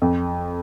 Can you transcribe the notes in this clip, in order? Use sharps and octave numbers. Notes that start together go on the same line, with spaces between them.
F2